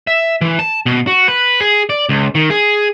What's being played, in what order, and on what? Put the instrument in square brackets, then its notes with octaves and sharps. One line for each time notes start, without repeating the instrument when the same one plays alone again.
[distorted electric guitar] E5
E3
A5
B2
F#4
B4
G#4
D5
C#2
D#3
G#4